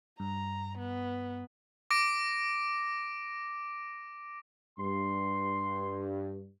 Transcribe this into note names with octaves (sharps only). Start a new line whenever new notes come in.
G2 A#5
B3
D6 A#6 D7
G2 C6